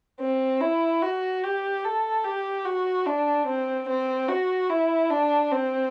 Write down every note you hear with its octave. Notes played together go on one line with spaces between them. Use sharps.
C4
E4
F#4
G4
A4
G4
F#4
D4
C4
C4
F#4
E4
D4
C4